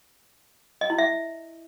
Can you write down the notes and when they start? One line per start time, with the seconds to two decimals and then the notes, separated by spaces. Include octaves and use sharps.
0.81 D#5
0.90 E4
0.98 E5